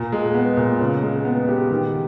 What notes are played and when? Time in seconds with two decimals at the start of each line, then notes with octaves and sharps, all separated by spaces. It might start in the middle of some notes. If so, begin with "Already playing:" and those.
Already playing: A#2
0.12 G#3
0.35 B3
0.57 A#2
0.80 C#3
1.03 G#3
1.25 B3
1.48 G4
1.71 D#3